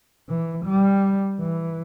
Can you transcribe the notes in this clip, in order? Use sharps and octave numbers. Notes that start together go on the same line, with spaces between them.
E3
G3
E3